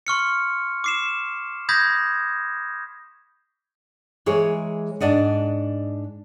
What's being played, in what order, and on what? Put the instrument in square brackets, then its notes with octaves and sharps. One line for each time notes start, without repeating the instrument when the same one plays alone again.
[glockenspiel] C6 C#6 F6 C#7
D6 C7 E7
B5 D#6 G6 G#6 A#6 B6
[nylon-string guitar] E3 G#3 G#4 A#4 C#5
G#2 D4 D5 D#5 F#5